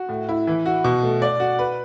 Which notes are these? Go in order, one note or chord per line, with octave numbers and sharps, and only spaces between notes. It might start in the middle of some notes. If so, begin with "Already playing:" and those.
Already playing: F#4
A2
E4
E3
F#4
B2
A3
D5
F#4
B4